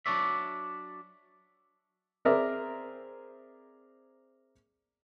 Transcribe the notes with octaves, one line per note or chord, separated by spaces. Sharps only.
F#3 D4 C#5 D5 E5
C4 G#4 A#4 D5 E5